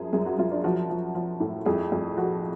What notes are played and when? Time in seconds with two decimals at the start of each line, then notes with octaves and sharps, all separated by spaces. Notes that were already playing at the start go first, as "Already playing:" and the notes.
Already playing: F#2 F3 G#4
0.13 F#2 G#4
0.26 F#4
0.39 F#2 F4
0.52 D4
0.64 F3 F#4
0.90 F3
1.15 F3
1.40 A2
1.65 F2 G#4
1.92 F2
2.17 F3 F#4